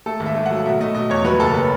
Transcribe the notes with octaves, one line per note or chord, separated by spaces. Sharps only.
A3 A4
G#1
E5
A3
F#3 F#5
B2 E5
A3 D#5
B2 D#5
E2 C#5
F#3 B4
F#1 A4
B4